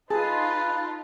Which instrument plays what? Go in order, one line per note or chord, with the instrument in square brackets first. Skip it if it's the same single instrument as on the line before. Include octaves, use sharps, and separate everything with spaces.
[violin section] D#4 F4 [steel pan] G#4 [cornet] B4 [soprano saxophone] A5